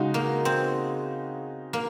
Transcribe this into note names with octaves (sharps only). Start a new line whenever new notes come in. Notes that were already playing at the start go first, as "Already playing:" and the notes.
Already playing: C#3 G#3 D#4 F#4
A#3
C4
A#3